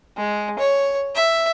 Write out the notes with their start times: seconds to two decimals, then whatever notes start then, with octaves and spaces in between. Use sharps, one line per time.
0.17 G#3
0.59 C#5
1.16 E5